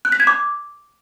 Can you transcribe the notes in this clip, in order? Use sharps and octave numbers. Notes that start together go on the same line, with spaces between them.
F#6
B6
G#6
D6